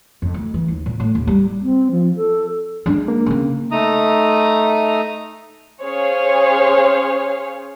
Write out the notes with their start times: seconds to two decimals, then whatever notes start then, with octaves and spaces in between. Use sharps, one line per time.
0.22 F2
0.34 D2
0.54 E3
0.68 D#2
0.86 A#2
1.00 A2
1.15 D#2
1.27 G3
1.63 C4
1.91 F3
2.17 A4
2.86 G#3 D4
3.08 A#3
3.26 C#3 C4
3.71 A3 D#4 A#5 D#6
5.83 C#4 G#4 C5 C#5 F5